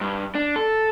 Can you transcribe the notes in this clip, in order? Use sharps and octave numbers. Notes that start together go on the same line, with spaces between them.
G2
D4
A4